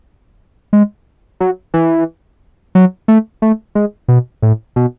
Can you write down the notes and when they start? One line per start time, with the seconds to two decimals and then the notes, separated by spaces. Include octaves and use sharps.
0.73 G#3
1.40 F#3
1.74 E3
2.75 F#3
3.08 A3
3.42 A3
3.75 G#3
4.08 B2
4.42 A2
4.76 B2